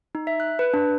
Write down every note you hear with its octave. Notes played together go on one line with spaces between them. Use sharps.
D#4
E5
F#6
B4
D4